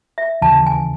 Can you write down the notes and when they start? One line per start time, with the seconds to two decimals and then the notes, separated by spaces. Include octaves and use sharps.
0.18 E5
0.42 D#2 C#3 E3 A5
0.67 G#5